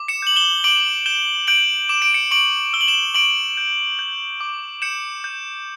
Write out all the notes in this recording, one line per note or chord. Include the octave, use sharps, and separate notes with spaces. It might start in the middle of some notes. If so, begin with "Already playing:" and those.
Already playing: D6
C#7 E7
G6 F#7
E7 G7
D6 D7 F#7
G6 E7 G7
G6 D7 F#7
D6 E7
D7
C#7 E7
C#6 D7 F#7
E6 G7
F#7
E7 G7
C#6 D7 F#7
G6
G6
D6
G6 C#7 E7
G6